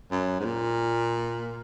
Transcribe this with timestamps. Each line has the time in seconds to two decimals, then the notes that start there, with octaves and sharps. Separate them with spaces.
0.12 F#2
0.40 G#2
0.45 A#2